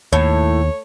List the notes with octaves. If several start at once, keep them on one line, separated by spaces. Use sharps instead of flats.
D#2 A2 C#5